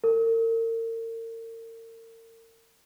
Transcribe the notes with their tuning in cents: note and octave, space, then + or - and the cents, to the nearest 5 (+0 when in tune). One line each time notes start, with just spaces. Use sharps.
A#4 -40